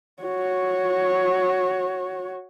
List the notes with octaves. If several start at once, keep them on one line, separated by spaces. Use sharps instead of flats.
F#4 C#5